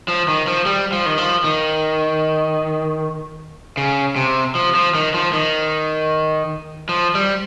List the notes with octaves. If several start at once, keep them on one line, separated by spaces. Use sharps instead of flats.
F3
D#3
F3
G3
F3
D#3
F3
D#3
C#3
C3
F3
F3
D#3
F3
D#3
F3
G3